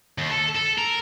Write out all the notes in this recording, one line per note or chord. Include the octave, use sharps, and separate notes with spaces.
D#2
A4
A4
A#4